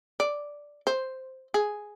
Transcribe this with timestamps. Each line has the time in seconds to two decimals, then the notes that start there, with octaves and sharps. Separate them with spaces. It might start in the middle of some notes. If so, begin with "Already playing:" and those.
0.20 D5
0.87 C5
1.54 G#4